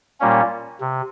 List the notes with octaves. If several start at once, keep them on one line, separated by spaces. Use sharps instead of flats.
A#2 G3 A#3 C#4
C3